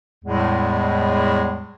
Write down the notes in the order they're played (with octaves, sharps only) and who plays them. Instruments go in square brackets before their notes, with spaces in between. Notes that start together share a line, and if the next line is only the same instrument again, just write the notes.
[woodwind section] E2 A2 G3 G#3